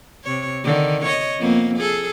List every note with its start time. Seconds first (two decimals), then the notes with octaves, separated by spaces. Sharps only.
0.24 C3 C#5
0.64 D3 D#3
1.05 C#5 D#5
1.39 F2 A#3 B3
1.77 G#4 A4